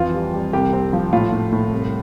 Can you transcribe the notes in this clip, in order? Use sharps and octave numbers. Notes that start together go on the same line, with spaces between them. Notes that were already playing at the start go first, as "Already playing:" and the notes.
Already playing: F2 E3 F4
G3
G3
C2 G4
C4
F3
A2 F4
A2
A2
C2